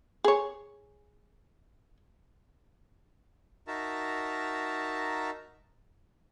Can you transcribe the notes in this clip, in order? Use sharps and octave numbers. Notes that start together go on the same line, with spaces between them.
G#4 C#5
D#4 F#4 A#4 E5 A5 A#5